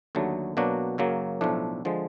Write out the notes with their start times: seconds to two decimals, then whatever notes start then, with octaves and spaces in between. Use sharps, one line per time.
0.15 D#2 D3 F#3 A3
0.57 B2 F#3 A#3 D4 F#4
0.98 F#2 C#3 F#3 A#3
1.41 B1 A2 F3 A3 D4
1.85 D3 F3 G#3